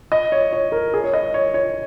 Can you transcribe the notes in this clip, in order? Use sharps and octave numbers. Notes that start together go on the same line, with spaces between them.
D#5
C#5
C#5
A#4
G#4
C#5
D#5
C#5
C#5